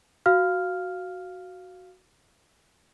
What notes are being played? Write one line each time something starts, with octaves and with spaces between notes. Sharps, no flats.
F#4 F5 F6